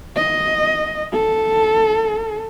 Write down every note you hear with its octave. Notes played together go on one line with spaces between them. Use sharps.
D#5
A4